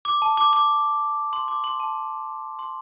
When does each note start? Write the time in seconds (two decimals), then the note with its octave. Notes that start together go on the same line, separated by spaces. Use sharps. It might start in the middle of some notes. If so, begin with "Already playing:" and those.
0.05 D6
0.22 A5
0.37 D6
0.53 D6
1.33 C6
1.48 D6
1.64 C6
1.80 A5
2.59 C6